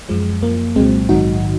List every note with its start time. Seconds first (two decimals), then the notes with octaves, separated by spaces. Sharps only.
0.09 F#2 F3 G#3
0.42 F#2 F3 A#3
0.76 C2 A#2 F#3 G#3 C4
1.09 A#1 G#2 D#3 F#3 D#4 F#4